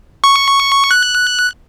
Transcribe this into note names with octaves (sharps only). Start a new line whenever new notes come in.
C#6
F#6